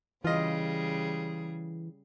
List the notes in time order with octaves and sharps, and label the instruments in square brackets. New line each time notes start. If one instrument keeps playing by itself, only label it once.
[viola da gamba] C#3 G3 G#4 [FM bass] E3 [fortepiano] F4 D#5